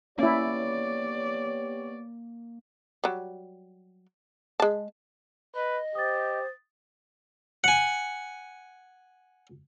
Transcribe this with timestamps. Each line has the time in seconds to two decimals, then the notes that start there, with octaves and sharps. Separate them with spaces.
0.18 A#3 B3 C#4 E4 G4 C#5 D5
3.04 F#3 G3
4.60 G#3 A5
5.55 B4 D#5
5.95 G4 C5 D#6 A6
7.64 F#5 G#5